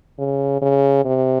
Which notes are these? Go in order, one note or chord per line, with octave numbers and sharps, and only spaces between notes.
C#3
C#3
C3